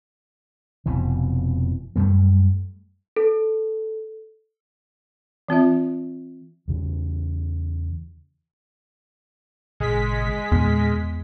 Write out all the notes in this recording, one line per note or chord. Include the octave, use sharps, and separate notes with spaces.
F1 F2 B2 E3
F#2 G3 A3
A4
E3 C4 F4 E5
E2 C#3
G#1 A#2 C#3 G#3 B6
E2 A#2